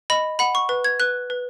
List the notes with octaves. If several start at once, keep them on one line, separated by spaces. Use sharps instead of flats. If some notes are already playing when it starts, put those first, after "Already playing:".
D#5 B5
F#5 B5
C#6
B4
G#6
B4 F#6
B4